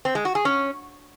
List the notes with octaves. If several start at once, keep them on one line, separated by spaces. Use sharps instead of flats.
C4
G#3
F#4
G#4
C#4